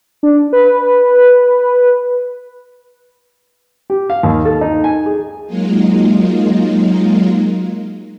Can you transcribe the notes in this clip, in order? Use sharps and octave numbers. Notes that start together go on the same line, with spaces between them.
D4
B4
G4
F5
D#2
A4
D#4
G#5
G#4
F#3 G#3 A#3 D#4 F4